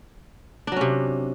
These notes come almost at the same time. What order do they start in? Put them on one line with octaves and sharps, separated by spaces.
D4 F#3 C#4 C3